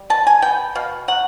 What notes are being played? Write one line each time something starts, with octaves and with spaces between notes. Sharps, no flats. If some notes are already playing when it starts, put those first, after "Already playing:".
Already playing: G3
B2 A5
G#5
B3 G5
B2 F5
F#3 F#5